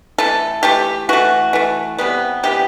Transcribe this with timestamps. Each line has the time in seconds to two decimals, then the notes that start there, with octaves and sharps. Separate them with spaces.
0.18 E3 A3 A4
0.63 E3 A3 G4
1.09 E3 A3 F#4
1.53 E3 A3
1.98 C3 E3 G3 B3
2.43 C3 E3 G3 B3 G4